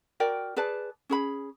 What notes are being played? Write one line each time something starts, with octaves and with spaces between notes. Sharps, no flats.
F#4 A#4 D5 G5
G#4 B4 D5 A5
C#4 G#4 B5